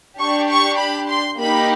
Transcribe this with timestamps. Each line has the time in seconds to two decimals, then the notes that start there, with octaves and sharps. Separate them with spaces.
0.19 D4 G4 C#6
0.49 C#6
0.79 B5
1.09 C6
1.39 A#3 D#4 G4 B5